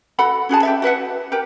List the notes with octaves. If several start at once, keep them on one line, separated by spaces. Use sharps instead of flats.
F#4 A4 F#5 B5
C#4 F#4 G#4 A5
G4 A4 E5
F#4 B4 E5 F#5
G4 A#4